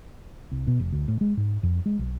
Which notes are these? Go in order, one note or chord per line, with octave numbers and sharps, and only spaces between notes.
C2
B2
F1
D2
A2
G#3
G#2
F2
G#3
B1